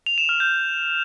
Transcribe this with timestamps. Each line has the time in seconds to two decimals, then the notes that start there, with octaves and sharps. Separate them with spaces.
0.06 F7
0.18 E7
0.29 F6
0.40 G6